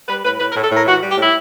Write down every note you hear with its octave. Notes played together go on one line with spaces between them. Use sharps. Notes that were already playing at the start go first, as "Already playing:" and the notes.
G3 B4
A2 B4
A2 B4
A#4
A2
A4
A2 A#4
E3 F#4
G3
G4
A2 E4